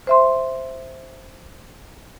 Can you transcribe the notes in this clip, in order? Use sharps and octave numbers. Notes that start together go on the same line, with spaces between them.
C5 E5 C6